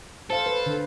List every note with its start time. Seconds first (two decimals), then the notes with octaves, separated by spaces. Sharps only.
0.30 A4 C5 F5
0.46 B4
0.66 D3